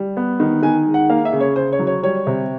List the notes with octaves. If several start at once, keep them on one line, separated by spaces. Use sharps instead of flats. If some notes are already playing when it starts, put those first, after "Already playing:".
Already playing: G3
B3
D#3
D#3 G#5
G#3
F#5
A#3 F5
E5
C#3
C#5
C#3 C5
C#5
F#3
C#5
G3 C#5
C3